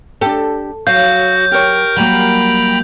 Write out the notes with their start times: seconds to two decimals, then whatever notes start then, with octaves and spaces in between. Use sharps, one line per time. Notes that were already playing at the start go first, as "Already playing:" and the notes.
0.21 D4 G4 A4
0.87 F#3 F#4 F5 G6
1.52 G4 A#4 C#5
1.97 F#3 G3 A#3 G5 A#5 B5